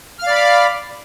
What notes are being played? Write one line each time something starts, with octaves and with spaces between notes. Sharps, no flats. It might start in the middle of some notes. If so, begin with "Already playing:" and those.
D5 F5 B5 D6 F6